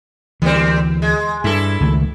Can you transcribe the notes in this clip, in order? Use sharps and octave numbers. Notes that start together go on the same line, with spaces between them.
D2 E3 G3 A#3 C4
G#3
G2 E4 A4
C#2 D#3 A3